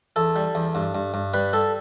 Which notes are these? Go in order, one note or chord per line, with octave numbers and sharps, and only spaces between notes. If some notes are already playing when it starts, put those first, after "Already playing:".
E2 A4
G3
E2
G2
G2
G2
G3 B4
G3 A4